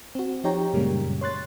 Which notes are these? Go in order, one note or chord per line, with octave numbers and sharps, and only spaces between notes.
C4 F#4
F3 D#4 G4 C#5 G5 A#5
F#2 A#2 C#3 G3 G#3 A#3
C#5 C6 F#6 A6